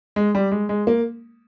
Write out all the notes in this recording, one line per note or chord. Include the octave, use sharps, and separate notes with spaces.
G#3
G3
G#3
G#3
A#3